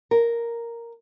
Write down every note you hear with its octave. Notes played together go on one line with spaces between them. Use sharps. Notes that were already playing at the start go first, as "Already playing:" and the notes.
A#4